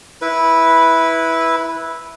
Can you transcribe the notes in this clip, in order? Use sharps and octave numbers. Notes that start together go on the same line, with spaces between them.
E4 B4